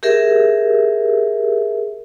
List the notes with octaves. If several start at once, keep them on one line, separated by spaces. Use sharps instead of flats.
G4 G#4 A#4 E5